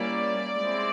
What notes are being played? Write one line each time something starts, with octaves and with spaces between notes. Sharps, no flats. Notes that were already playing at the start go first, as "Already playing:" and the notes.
Already playing: G3 A#3 C#4 E4 D5
G#3 C4 E4